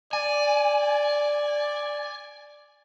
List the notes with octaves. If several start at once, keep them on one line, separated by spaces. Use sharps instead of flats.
D5 G#5